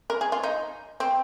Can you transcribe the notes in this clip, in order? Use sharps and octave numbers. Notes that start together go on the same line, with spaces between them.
A#4
G#4
F4
D#4
C4